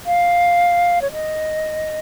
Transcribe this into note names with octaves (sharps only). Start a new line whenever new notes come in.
F5
C#5
D#5